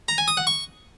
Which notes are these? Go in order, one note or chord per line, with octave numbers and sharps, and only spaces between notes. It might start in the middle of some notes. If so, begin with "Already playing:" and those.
A#5
G#5
D#6
F#5
C#6